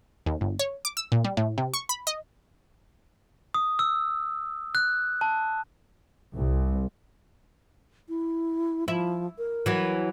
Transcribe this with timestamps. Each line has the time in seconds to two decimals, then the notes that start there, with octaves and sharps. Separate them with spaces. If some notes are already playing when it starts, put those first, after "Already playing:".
0.26 D#2
0.41 G1
0.59 C#5
0.85 D6
0.97 E6
1.12 A#2
1.25 G3
1.37 A2
1.58 C3
1.74 C#6
1.89 B5
2.07 D#5
3.54 D#6
3.79 E6
4.75 F#6
5.21 A5
6.35 C2
8.09 E4
8.88 F3 E4
9.38 A#4
9.66 E3 F#3